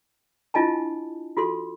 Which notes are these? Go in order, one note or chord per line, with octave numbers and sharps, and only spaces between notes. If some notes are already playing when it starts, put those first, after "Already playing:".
D4 E4 F4 D#5 G#5 A5
F4 F#4 A4 C6